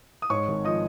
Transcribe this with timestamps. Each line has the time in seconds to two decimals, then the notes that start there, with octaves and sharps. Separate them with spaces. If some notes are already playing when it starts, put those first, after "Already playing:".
0.22 D#6
0.30 G#2 C#5 C#6
0.48 G#1
0.65 F3 D#5 D#6